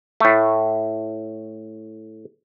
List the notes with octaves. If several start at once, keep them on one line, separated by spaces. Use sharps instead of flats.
A2 A3